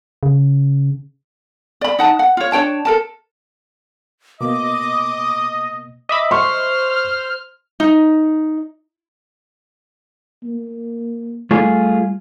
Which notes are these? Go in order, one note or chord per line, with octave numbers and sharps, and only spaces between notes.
C#3
D5 B5
D#4 F#5 A5
F#5
F4 C#5
D4 C#5 G5 A5
A4 A#4 A5
B2 A#3 D#5 D6
D#5 E5 B5 D6
C5 C6 C#6 F6
D#4
A#3
G3 A3 F4 G#4